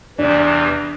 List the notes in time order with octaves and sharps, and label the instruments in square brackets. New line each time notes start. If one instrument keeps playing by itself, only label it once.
[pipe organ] E2 C3 E3 [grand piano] D4